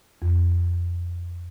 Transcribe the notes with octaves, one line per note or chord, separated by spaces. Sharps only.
F2